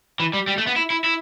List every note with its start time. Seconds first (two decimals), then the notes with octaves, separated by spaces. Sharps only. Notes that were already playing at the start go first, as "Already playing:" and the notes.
0.20 E3
0.34 G3
0.47 G3
0.58 A3
0.67 B3
0.76 E4
0.90 E4
1.04 E4